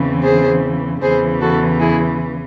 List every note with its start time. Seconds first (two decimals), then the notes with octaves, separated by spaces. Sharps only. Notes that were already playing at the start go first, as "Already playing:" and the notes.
Already playing: E2 C#3 E3 C4
0.23 G#4 C5
1.01 E2 C#3 E3 G#4 C5
1.41 F#4 A4
1.80 E4 G#4